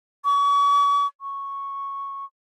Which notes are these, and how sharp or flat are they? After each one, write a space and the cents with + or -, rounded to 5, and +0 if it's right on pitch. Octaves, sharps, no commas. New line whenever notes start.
C#6 +40
C#6 -5